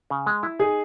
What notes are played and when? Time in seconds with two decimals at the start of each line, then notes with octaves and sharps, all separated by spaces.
0.10 C#3
0.26 G#3
0.43 E4
0.59 D#4 G#4